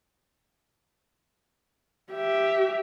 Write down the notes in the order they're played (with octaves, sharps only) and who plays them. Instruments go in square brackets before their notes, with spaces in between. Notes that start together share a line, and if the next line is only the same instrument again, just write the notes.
[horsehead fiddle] G4 E5